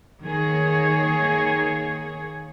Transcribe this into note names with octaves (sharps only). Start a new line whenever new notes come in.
D#3 A#3 G#4 C#5